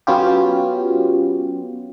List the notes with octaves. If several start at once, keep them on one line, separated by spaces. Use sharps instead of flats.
F#3 B3 C#4 F4 G4